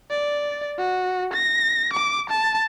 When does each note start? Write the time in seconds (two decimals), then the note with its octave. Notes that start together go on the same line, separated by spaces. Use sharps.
0.10 D5
0.78 F#4
1.33 A#6
1.93 D6
2.30 A5